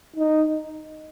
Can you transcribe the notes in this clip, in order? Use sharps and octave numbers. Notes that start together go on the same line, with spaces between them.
D#4